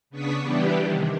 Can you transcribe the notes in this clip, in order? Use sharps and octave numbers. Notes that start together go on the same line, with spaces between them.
C#3 B3 D4 C#6 D#6 B6
E3 G3 B3 D4 E4 G4
C3 D#3